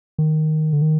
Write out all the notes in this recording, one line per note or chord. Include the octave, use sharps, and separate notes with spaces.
D#3
D3
D#3